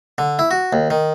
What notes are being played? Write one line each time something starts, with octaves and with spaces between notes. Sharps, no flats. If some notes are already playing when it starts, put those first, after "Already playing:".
D3
E4
F#4
D#2
D#3